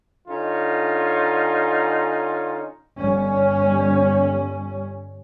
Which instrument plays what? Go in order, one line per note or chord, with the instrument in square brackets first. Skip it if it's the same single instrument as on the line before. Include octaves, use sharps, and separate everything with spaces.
[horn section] D3 C#4 D#4 F4
[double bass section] G1 G3 C#4